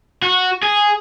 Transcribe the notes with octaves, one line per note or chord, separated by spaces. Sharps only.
F#4
G#4